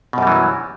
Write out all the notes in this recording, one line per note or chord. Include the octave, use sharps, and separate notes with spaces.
F#2 B2 E3 F#3 G3